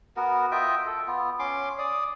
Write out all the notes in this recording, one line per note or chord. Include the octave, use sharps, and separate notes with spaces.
B3 F#4 A#4
F4 D#5 E5 G5
A4
B3 F4
C#4 C6 D6
D5 D#6